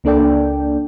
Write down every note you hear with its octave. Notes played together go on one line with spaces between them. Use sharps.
C#2 A#3 D4 A4 D5 G5